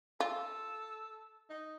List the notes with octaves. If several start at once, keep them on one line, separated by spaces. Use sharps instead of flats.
F4 A4
D#4